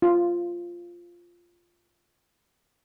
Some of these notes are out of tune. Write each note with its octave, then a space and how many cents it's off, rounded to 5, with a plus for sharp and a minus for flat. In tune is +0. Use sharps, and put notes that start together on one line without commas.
F4 -5